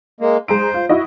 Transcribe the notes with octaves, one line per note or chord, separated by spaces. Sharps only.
G#3 A#3
G#3 C5 A#5 D7
F4
E4 F#4 D#5